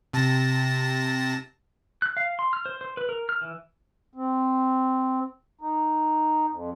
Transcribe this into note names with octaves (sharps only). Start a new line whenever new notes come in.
C3 A5 A#6
F#6
F5
C6
F6
C5
C5
B4
A#4
F6
E3
C4
D#4
F2